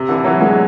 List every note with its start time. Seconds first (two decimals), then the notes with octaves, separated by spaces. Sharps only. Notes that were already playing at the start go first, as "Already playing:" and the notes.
Already playing: C3
0.09 D3 E3
0.24 E3 F#3
0.41 F#3 G#3